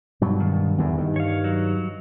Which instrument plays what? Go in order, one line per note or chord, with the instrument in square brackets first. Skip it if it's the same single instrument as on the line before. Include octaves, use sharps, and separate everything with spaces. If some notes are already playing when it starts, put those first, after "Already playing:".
[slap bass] G2 B2 F#3
[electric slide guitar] D#3
[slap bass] E2 G2 D3
G2 D#3
[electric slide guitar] C#5 F5
F#3